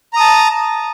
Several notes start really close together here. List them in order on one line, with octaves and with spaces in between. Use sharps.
A#5 D#6 A5